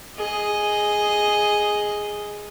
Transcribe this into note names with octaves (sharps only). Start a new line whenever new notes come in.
G#4 D#5